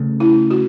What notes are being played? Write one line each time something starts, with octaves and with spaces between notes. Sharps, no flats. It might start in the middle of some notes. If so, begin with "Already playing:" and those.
Already playing: C#3 A3 C#4
E4
F#4